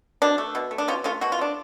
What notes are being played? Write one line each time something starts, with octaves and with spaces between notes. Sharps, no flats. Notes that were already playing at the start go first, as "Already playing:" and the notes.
B2 D4
A3
B2
A3
D4
B2 C#4 F4
A3 C#4 F4
B2 F#4
F4
A3 D4